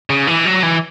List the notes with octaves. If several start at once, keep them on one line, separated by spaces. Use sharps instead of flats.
C#3
E3
F#3
E3